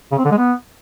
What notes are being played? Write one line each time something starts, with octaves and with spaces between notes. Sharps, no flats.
C#3
C4
D3
G#3
B3